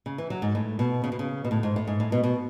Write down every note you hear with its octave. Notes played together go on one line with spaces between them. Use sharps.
C#3
E3
F#3
G#2
A2
B2
C#3
B2
C#3
B2
A2
G#2
A2
G#2
A2
B2
B2